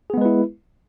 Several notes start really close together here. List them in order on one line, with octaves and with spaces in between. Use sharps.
G#4 B3 G#3 B4 E4